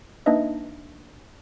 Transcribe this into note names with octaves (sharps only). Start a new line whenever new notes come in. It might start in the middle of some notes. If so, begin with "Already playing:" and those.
A#3 D4 D#4 B4 D#5 E5